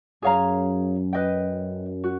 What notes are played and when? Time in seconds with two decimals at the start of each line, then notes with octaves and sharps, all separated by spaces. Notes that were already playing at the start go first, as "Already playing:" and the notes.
0.22 F#2 G#4 C#5 F5 A#5
1.13 B4 D#5 G5
2.04 F#4